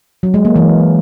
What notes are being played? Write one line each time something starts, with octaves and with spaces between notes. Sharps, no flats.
F#3
G#3
A#3
E3